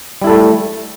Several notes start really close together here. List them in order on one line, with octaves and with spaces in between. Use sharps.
G3 E4 A4 A3